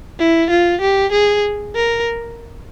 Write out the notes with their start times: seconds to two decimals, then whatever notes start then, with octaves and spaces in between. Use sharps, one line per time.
0.19 E4
0.50 F4
0.81 G4
1.12 G#4
1.75 A#4